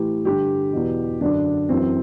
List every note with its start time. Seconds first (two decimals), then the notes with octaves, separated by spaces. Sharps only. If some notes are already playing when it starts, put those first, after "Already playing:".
Already playing: A2 E3 G4
0.25 G2 D3 G4
0.73 E2 B2
1.21 F#2 D3 D4
1.69 F#2 E3 C4